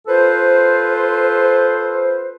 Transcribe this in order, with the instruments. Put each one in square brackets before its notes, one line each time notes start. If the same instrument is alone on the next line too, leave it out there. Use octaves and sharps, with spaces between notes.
[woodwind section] F4 A4 B4 C5